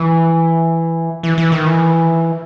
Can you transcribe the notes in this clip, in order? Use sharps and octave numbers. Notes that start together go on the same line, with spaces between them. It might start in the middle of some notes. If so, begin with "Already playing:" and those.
Already playing: E3
E3
E3
D#3
E3